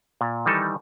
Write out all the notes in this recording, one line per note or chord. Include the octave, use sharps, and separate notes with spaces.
A#2
D#3 E3 G3 D#4 A4